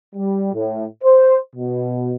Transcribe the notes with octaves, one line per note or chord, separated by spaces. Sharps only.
G3
A2
C5
B2